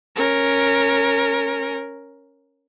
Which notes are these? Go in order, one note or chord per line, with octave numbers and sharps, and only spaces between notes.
C#4 A#4